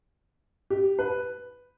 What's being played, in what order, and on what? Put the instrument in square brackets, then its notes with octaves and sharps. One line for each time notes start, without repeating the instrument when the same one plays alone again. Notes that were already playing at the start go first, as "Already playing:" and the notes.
[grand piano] G4
B4